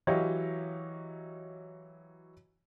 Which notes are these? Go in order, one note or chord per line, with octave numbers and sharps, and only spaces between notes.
E3 F#3 G4 C#5 D#5 F5